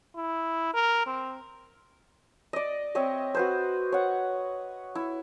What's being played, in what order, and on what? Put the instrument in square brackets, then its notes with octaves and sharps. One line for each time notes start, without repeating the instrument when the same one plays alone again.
[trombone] E4
A#4
C4
[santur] D5 D#5
C4 C#5 D#5 E5
F#4 B4 C5
C#5 F#5
E4